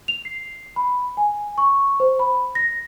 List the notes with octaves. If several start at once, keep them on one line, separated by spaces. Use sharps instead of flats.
F7
C7
B5
G#5
C#6
C5
B5
A#6